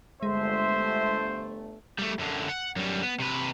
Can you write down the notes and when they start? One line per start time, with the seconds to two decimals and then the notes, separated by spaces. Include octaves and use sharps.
0.23 G1 G#3 A3 C5 E5 C6
1.98 G3 A3
2.19 F#2 D3
2.49 F#5
2.76 F#2 G3
3.03 B3
3.20 C3 B4